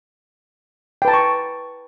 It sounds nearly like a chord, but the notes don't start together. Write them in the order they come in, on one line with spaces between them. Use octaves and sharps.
G5 B4 A5 A#5 C#6